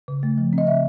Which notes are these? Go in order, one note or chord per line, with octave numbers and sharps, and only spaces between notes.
C#3
A3
F3
C4
D#5
C#3 E5